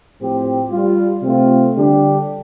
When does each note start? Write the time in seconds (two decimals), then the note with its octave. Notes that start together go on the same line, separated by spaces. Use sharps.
0.19 A2 F3 C4 G4
0.71 G3 F4
1.22 C3 A3 C4 F4
1.76 D3 G3 D4 G4